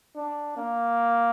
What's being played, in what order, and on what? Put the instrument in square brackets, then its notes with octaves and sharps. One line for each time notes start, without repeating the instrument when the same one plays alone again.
[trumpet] D4
A#3